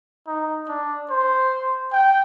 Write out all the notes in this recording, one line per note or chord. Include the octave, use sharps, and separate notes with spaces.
D#4
D4
C5
G5